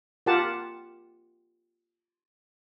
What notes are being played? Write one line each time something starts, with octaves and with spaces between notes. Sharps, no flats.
F4 G4 A#4 F#5 A5